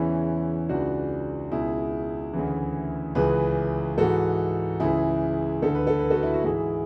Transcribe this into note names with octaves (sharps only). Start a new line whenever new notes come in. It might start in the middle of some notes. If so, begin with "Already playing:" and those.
Already playing: E2 C#3 E3 C#4 E4
C#2 C#3 E3 D4 F#4
C#2 B2 E4 G#4
D2 C#3 E3
C#2 C#3 E3 G#4 B4
G#2 E3 F#4 A4
C#2 C#3 E3 E4 G#4
D2 D3 A4
B4
A4
B4
F#4 A4
E4
F#4
G#2 E3 E4 G#4